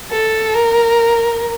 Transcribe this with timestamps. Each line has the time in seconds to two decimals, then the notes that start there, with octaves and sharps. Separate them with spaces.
0.11 A4
0.53 A#4